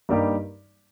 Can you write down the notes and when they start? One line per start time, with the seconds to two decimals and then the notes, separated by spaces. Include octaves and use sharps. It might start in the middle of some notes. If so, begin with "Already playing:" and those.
0.09 G2 G3 A#3 D#4 G4